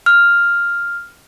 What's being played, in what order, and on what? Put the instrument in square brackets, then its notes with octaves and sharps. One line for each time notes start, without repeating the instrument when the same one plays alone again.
[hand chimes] F6